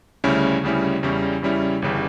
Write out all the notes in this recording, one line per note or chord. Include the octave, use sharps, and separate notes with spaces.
D2 C#3 G3 C#4 E4
D2 C#3 G3 C#4 E4
E2 C#3 G3 C#4 E4
E2 C#3 G3 C#4 E4
G1 C#3 E3 G3